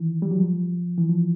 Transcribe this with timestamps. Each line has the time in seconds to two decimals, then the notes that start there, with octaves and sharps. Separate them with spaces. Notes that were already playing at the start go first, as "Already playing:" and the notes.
Already playing: D#3 E3
0.22 G3
0.31 F#3
0.40 F3
0.98 E3
1.09 F3